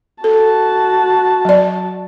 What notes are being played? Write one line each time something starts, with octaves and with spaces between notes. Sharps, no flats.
F#4 A4 A5
F#3 D5